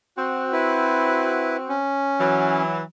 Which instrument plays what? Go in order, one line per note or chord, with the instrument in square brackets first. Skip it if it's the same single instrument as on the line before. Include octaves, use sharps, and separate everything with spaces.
[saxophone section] C4 F#4
[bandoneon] E4 B4
C#4
[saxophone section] E3 F#3